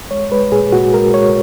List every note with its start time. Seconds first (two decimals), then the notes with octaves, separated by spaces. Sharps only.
0.11 G#3 C#5
0.32 G#3 B4
0.52 A#2 G#4
0.72 A#2 F#4
0.94 G#3 A#4
1.14 G#3 C#5